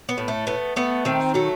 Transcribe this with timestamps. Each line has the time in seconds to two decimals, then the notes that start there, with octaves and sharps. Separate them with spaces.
0.09 B3
0.18 A2
0.28 A3
0.47 A3 B3
0.76 A3 B3
1.05 D#3 C4
1.34 F#3 A3